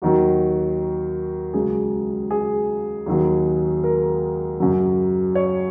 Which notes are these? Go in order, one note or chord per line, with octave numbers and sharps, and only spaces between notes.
D#2 D#3 F#3 F#4
C#2 C#3 F#3 G#4
G#4
D#2 D#3 F#3
A#4
F#2 C#3 F#3
C#5